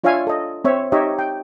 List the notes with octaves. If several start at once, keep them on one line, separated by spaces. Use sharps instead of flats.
D4 F4 C#5 E5 F5 G#5
A4 D#5
C4 C#5 E5
D#4 G4 C#5 D#5 E5
G5